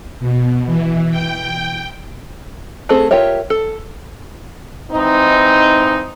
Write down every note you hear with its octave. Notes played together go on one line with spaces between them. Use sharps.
B2
E3
G5
A3 C4 G#4 A4
F4 G4 A#4 C#5 E5
A4
G#2 E3 C4 D#4